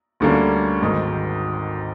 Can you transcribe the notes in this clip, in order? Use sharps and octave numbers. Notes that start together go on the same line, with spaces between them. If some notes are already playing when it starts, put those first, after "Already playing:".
D2 D3 G3 A#3 C#4
G#1 G#2 D#3